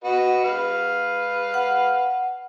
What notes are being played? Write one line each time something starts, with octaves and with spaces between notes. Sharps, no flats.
F#4 B4 D#5
B4 F5
F#5